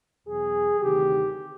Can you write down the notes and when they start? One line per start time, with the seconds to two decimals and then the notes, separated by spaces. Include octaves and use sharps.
0.27 E2 B2 F#3 G#4
0.80 D2 C3 D#3 F#3 G4